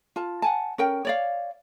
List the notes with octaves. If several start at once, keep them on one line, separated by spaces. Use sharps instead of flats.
F4 A5
F#5 G#5 A5
C#4 A#4 G5
C#5 D5 F5